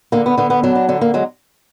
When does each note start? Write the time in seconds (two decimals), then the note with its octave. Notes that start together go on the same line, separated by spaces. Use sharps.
0.12 D3 A#3
0.26 B3
0.38 D3 B3
0.50 B3
0.63 F#3 D4
0.75 D4
0.88 D3 D4
1.01 A#3
1.14 F#3 G#3